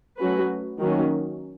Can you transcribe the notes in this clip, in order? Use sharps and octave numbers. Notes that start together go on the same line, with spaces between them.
F#3 A3 C#4 F#4 B4
D#3 F#3 A#3 C#4